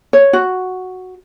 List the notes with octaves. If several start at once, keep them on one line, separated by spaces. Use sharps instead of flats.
C#5
F#4